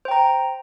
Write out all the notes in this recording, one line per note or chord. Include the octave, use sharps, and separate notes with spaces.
C5 G5 A#5